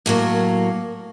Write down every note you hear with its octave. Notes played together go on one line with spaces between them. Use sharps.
A2 F#3 A#3